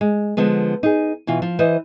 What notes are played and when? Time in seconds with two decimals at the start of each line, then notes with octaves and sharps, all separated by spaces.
0.01 G#3
0.37 D3 F3 G#3 B3
0.83 D#4 G#4
1.27 B2 E3 F4
1.42 F3
1.59 E3 B4 C5 D#5